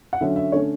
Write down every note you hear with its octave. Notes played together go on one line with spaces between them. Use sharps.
F#5
D3 F#3 C#4 E5
E5
D3 A3 C#4 C#5